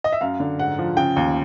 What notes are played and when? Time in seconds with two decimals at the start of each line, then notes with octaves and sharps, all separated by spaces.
0.04 D#5
0.12 E5
0.21 F#2 F5
0.40 D3
0.59 G#2 F#5
0.79 F3
0.97 C#3 G5
1.16 D#2